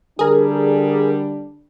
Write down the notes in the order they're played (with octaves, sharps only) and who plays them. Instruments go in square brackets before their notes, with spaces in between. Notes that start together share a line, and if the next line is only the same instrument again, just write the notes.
[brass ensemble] D3 G3 D4 [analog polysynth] G#4 A#4